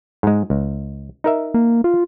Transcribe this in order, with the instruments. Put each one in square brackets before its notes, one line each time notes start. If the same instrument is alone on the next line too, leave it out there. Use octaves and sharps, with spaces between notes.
[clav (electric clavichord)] G#2 G#3
C#2
D#4 A#4 E5
[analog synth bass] A#3
F4